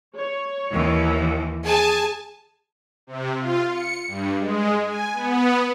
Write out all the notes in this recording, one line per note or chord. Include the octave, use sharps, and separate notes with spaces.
C#5
D#2 E3
G#4 G#5 A5
C3
F4
C#7
G2
G#3
G#5
B3